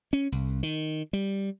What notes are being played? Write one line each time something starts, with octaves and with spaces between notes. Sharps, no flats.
C#4
C2
D#3
G3